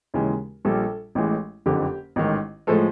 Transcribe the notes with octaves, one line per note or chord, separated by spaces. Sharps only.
D#2 C#3 E3 G#3
A#1 A#2 G3 A4
A1 A2 E3 G#3
F#1 F2 D3 G4
A1 G#2 D#3
A2 F3 G#3 A4